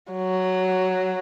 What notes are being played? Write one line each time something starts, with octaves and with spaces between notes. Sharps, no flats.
F#3